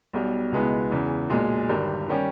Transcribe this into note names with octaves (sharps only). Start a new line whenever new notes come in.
B1 B2 G3
C#2 B2 G#3 B3 E4
E2 C#3 E3
B1 A#2 G#3
G1 G2 D#3 G3
D#3 G3 C#4 G4